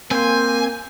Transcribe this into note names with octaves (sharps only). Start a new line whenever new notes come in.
A#3 C4 C5 G#5